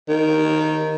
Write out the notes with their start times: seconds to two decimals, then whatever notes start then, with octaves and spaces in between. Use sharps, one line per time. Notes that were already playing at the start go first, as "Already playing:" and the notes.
0.09 D#3